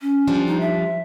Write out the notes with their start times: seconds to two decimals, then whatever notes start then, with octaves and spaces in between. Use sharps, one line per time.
0.01 C#4
0.27 F3 G3 D4
0.47 D#4
0.61 E5